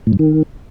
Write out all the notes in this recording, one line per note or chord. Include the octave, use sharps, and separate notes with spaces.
A2
G2
D#3